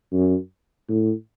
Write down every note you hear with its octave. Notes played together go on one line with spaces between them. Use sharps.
F#2
A2